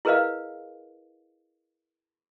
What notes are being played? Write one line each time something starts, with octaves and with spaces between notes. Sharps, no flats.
E4 G#4 A#4 B4 D#5 F5